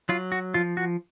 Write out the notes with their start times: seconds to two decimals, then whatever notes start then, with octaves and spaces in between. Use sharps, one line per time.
0.09 F#3 F4
0.32 F#4
0.54 F3 F4
0.77 F#4